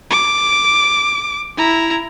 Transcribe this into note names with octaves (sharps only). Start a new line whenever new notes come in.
D6
E4 A#5